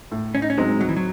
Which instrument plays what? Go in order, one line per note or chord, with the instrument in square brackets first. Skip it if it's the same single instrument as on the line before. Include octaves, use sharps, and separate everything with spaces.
[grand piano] A2
[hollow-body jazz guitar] C#4
D#4
C#4
[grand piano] F#3 C4 D#4 [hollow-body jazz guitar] G#3
[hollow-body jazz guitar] F#3
E3
F#3